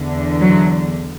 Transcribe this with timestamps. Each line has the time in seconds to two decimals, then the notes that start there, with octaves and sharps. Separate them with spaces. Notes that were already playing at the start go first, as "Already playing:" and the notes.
Already playing: E2 D3
0.41 F#3